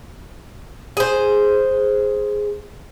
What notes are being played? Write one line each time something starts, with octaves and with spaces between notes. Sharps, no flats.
G#4 C5